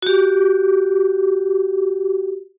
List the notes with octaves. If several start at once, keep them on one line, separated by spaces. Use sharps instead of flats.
F#4 G4